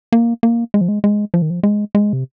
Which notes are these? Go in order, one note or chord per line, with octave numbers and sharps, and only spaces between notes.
A#3
A#3
G#3
F3
G#3
G#3
F3
D#3
F3
G#3
G#3
C3